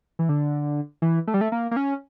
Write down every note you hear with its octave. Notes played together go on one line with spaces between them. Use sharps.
E3
D3
E3
A3
G3
A3
A#3
A#3
C#4